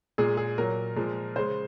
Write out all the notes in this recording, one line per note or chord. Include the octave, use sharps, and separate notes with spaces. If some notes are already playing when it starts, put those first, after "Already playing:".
A#2 G#3 G#4
G#4
A#2 F#3 A#4
A#2 F3 G#3
C#3 G#3 C5